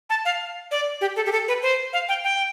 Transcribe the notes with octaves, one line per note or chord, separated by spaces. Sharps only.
A5
F5
D5
G4
A4
G4
A4
B4
C5
F5
G5
G5